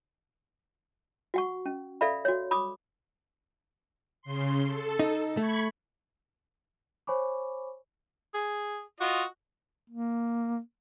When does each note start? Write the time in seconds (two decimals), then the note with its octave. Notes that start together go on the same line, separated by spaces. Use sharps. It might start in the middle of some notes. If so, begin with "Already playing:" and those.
1.34 F#4 F#5 C#6
1.66 C#4
2.01 A4 D5 E5 F5 B5
2.25 F#4 C#5
2.51 B5 D6 D#6
4.22 C#3 C6
4.67 A4
4.99 D#4
5.37 A3 B5 C#6 G#6
7.07 C5 C#5 G#5 B5 C#6 D6
8.34 G#4
9.00 F4 F#4 D#5
9.90 A#3